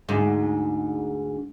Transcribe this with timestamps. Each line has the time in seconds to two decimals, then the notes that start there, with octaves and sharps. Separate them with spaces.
0.09 D2 G#2